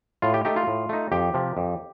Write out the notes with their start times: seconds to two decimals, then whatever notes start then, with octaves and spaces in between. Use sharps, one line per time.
0.22 A2 F4
0.34 G4
0.45 A3 D#4 G4
0.56 F4
0.67 A2
0.89 A3 D#4
1.12 F2 G4
1.34 C3 F3
1.57 F2